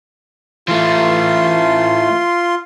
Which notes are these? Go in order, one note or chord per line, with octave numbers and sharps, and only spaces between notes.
E3 A3 F4 C6